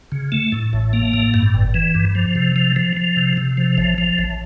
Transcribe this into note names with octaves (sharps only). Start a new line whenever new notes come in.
C#3
A3
A2
A1
A#3
A2
G2
G1
E3
G2
F3
C3
F3
F3
F3
C3
C3
F3
A1
F3
A1